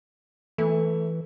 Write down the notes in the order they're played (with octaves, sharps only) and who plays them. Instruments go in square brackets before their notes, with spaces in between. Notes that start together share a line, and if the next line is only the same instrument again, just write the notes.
[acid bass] E3 [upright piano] A3